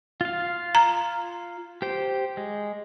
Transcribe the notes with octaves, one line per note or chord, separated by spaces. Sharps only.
F4 F5
A#5
G4 C5 G5
G#3